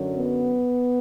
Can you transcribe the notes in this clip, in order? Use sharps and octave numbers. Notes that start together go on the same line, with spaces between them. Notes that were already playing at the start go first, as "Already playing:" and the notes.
Already playing: F#2 D3 F#3
B3